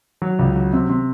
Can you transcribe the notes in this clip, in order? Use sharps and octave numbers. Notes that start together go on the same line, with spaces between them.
F#3
C#2
F#3
C3
C3